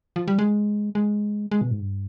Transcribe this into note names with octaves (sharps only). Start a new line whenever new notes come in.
F3
G3
G#3
G#3
G#3
B2
G#2
G2